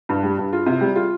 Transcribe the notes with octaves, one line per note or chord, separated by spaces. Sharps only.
G2
G3
G2
F4
C3
G3
F4